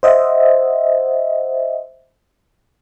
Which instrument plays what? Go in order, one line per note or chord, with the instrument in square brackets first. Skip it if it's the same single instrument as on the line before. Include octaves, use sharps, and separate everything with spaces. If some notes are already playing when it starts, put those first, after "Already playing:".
[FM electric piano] C5 D#5 E5 F#5